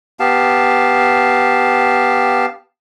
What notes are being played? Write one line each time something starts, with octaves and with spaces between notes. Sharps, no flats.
B3 G4 F5 A5